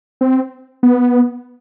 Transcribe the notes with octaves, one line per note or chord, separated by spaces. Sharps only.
C4
B3